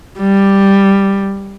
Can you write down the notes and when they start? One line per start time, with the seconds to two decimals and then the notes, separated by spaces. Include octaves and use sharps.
0.19 G3